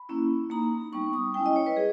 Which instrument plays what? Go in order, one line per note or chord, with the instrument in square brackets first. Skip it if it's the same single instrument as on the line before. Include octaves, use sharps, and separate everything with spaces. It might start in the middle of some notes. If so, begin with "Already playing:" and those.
Already playing: [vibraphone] B5
A#3 C#4 E4
A#3 D#4 A#5
G3 B3 D#4 C#6
D#6
G#3 C#4 E4 G5
D#5
C#5
B4
G3 G#4